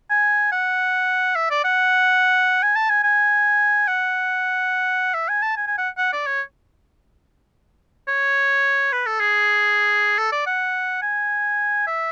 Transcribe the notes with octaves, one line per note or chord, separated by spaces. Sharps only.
G#5
F#5
E5
D5
F#5
G#5
A5
G#5
G#5
F#5
E5
G#5
A5
G#5
G#5
F#5
F#5
D5
C#5
C#5
B4
A4
G#4
A4
D5
F#5
G#5
E5